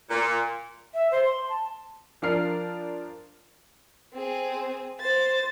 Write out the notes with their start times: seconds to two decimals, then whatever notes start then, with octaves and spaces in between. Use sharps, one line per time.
0.10 A#2
0.94 E5
1.12 C5
1.25 C6
1.49 A5
2.22 F3 D4 F4 A#4 F6 C7
4.13 C4 G#4
5.00 C5 A6